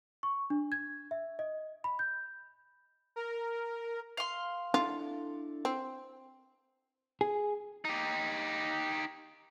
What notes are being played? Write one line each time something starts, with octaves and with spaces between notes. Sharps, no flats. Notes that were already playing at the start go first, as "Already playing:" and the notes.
C#6
D4
G#6
E5
D#5
B5
G6
A#4
F5 C6
D4 E4 F4 A4
C4
G#4
D#4 G4